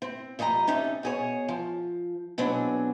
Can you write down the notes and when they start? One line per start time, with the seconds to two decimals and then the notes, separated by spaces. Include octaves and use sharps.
0.02 C4
0.39 F2 G3 D#5 G#5 A#5
0.67 C3 C#4 D#4 A4
1.03 B2 G#4 C#5
1.49 F3
2.38 B2 F#3 C4 D4 G#4